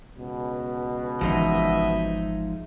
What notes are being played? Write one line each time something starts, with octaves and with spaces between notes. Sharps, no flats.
C#2 B2
G#1 E3 F3 G#3 D#4 D#5 E5